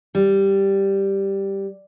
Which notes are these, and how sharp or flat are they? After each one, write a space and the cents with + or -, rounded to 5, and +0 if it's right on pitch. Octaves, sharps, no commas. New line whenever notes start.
G3 +0